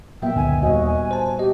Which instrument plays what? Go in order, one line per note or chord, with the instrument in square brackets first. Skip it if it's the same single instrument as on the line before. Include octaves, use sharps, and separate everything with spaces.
[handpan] A#2 B3 E5 [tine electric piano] F#3 A#3 [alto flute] G5
[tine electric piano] C#2 F#2 D3 [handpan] D#4 [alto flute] G#5
[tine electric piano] D#2 [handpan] G3 F#4 [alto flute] D#5
[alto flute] G#5
[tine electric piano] C5 A5
[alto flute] G4 [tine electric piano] D#5